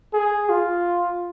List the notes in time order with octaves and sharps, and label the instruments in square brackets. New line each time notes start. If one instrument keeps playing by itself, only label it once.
[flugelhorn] G#4
F4